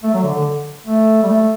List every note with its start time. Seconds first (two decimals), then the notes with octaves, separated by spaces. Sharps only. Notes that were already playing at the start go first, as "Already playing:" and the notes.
0.03 A3
0.14 F#3
0.24 D3
0.35 D3
0.87 A3
1.23 G3
1.29 A3